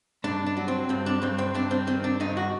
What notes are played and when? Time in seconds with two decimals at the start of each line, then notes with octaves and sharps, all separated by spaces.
0.24 G2 D4
0.46 D4
0.57 F#3
0.68 C4
0.89 G2 C4
1.06 D4
1.22 G2 C4
1.38 C4
1.54 G2 D4
1.71 C4
1.87 D#3 C4
2.04 D4
2.20 G2 D#4
2.37 F#4